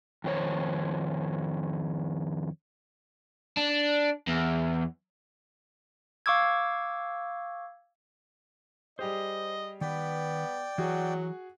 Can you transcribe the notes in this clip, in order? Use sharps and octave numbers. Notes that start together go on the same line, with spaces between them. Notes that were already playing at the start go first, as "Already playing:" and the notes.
F2 D#3 C5 C#5
D4
E2
F5 C#6 D6 E6 G#6
G3 G4 G#4 C5 D#5
D#3 B3 B4 D5 G5
E3 F#3 F#4 G#4